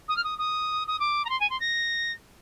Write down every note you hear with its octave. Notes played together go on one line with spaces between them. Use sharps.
D#6
F6
D#6
D#6
D#6
D6
A#5
C6
G#5
C6
A#6